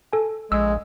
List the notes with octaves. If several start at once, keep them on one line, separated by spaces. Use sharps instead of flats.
A4 G#5
A#1 G#3 E6